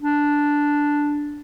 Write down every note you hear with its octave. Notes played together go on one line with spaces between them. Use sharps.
D4